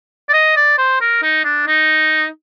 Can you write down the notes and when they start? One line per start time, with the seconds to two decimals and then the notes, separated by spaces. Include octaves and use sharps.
0.29 D5
0.33 D#5
0.56 D5
0.78 C5
1.01 A#4
1.23 D#4
1.44 D4
1.67 D#4